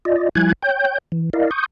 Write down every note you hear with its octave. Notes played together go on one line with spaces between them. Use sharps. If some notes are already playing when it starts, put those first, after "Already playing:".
F4 D5 D#5
F3 G3 E4 G#5 F#6 G#6
C#5 G5 G6
E3
E4 A#4 D5 D#5 F5
C#6 D#6 G6